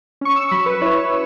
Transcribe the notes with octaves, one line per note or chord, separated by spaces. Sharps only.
C#4 C#6
E6
F#3 B5
B4
E4 C#5